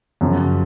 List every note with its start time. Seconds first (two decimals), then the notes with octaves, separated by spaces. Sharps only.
0.21 F#2 C#3 F3